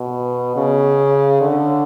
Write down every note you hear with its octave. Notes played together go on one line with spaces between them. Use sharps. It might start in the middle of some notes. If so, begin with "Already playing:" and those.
Already playing: B2
C#3
D3